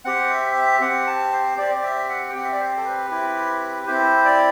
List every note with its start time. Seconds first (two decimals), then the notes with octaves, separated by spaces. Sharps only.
0.05 C4 G4 F#5
0.30 E5
0.56 E5
0.81 C4 G4 F#5
1.07 A5
1.32 C5
1.58 C4 G4 D5
1.75 D5
1.84 E5
2.09 F#5
2.30 G5
2.35 C4 G4 F#5
2.45 E5
2.52 D5
2.60 C5
2.77 A4
2.85 B4
3.10 C4 E4 G4
3.87 C4 E4 G4 C5
4.25 D5